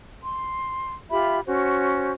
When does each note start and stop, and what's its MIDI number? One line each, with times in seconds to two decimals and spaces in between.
0.24 0.94 84
1.10 1.39 65
1.10 1.39 67
1.10 1.39 76
1.10 1.39 83
1.46 2.12 61
1.46 2.12 66
1.46 2.12 72